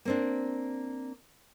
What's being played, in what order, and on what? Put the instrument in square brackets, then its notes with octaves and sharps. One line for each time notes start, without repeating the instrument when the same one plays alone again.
[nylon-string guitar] A#3 C4 D4